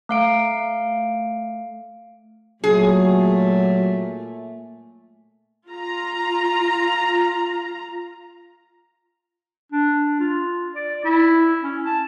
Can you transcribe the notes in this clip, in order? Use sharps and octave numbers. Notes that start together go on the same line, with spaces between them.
A3 F5 D7
A#2 F#3 A3 G#4
F4 A#5
D4
F4
D5
E4
C#4
A5